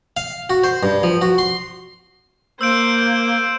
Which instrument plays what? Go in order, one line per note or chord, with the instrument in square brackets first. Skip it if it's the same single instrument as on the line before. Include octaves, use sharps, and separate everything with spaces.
[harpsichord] F5
F#4
C5
G2
F3
F#4
C6
[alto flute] A#3 [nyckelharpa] C5 [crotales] E6 G6 D7